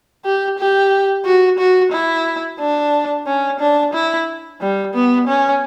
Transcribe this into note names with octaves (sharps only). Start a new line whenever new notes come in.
G4
G4
F#4
F#4
E4
D4
C#4
D4
E4
G3
B3
C#4